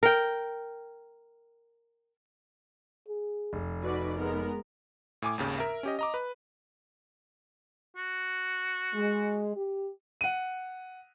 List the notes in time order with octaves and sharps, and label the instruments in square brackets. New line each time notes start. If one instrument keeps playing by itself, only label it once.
[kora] A#4 G5
[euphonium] G#4
[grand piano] F1
[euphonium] D#4 [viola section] F#4 B4 D5
[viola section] G#3 B3 A#4
[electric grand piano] A2 G#5 D6
G#1 D#2 C#3
A#4 E5
C#4 G4 D#5
D#5 A#5 D6
B4
[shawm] F#4
[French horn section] G#3
G4
[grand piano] F#5 D#7